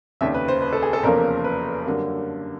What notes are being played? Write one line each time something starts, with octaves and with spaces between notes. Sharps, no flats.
F1 D#2 C#3 E5
B4
C5
B4
A4
G#4
A4
F1 E2 C#3 F3 A#3 A#4
B4
F#2 D3 G3 A#3